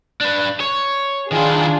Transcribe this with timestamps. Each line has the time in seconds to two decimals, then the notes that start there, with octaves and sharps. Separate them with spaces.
0.21 D4 B4
0.60 C#5
1.32 D#3 D4 E4 F4 G#4